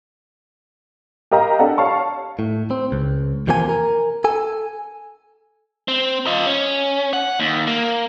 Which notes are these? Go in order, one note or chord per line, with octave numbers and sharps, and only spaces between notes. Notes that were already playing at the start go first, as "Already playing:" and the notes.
G4 A#4 D#5 F5 A#5
D4 G4 A4 F#5
C#5 F5 A5 C#6
A2
C4
C#2
E2 C3 F3 A#3 A4 G#5
A#4
A4 G#5
C4
F4 D#5
C#4
F#5
D#2
A#3